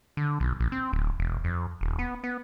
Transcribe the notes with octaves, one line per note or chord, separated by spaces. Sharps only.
D3
B1
A#1
C4
D1
E1
F2
D#1
B3
B3